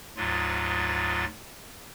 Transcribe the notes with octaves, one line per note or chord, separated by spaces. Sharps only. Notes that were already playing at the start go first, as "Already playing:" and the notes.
D2 G#2 F#3 F4 A6